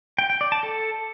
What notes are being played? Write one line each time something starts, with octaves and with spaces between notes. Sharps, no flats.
G5
G5
D5
A5
A4